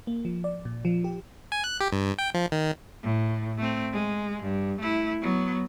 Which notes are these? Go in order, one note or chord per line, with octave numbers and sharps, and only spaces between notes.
A#3
F3
D5
A#2
F3
G4
G#5
F#6
G4
G2
G5
F3
D#3
A2
A3 C4
G#3
G2
A3 E4
F#3 B3